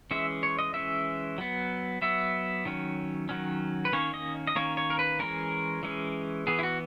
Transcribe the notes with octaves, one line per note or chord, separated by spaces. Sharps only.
E3 G#3 C#4 E5
C#5
D#5
E3 G#3 C#4 E5
F#3 B3
F#3 B3 E5
D#3 F#3 C#4
D#3 F#3 C#4
B4
D#3 A#3 C#4 C#5
D#5
D#5
D#3 A#3 C#4 C#5
C#5
A#4
B4
E3 G#3 C#4 A#4
E3 G#3 C#4
E3 B3 G#4
E4
F#4